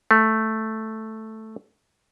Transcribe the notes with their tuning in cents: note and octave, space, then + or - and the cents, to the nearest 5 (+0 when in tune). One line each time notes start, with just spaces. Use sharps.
A3 +0